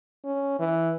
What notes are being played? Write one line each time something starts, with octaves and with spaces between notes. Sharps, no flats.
C#4
E3